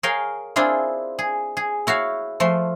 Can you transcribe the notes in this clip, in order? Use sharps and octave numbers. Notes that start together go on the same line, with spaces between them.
G#4 A#4 C#5 F5 G5
C4 D4 E4 F4 G#4
G#4
G#4
E4 F#4 C#5 F5
F3 A3 C6